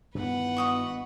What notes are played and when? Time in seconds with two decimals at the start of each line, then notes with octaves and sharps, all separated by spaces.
0.15 G2 D#3 E3 B3 B4 F#5
0.57 F#4 D#5 C#6